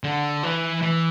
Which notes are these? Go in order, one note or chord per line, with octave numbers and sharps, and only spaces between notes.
D3
E3
E3